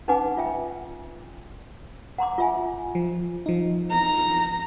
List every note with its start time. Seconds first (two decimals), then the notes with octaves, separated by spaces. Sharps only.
0.08 C#4 D#4 B4 F#5 G#5 D6
0.37 F4 E5 G5
2.18 F#5 A#5 C6 D6
2.38 F4 E5 G#5
2.95 F3
3.46 F3 D#4
3.91 A#5